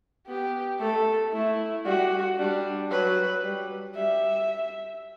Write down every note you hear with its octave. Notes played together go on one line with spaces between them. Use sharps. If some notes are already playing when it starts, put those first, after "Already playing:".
B3 G4
A3 A4
A3 E4
G3 F#4
G3 D4
F#3 B4
G3
G3 E5